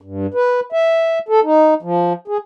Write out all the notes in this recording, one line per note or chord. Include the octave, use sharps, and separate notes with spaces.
G2
B4
E5
A4
D#4
F3
G#4